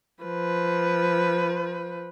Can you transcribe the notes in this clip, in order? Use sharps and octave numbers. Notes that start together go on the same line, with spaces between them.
F3 B4